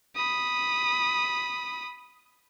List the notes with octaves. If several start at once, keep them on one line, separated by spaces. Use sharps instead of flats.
B5 D#6